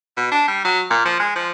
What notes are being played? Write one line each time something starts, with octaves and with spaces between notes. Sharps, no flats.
B2
D4
G3
F#3
A#2
F3
G#3
F3